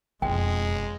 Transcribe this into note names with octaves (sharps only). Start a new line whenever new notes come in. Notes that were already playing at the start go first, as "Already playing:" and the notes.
E1 F2 G#3 G5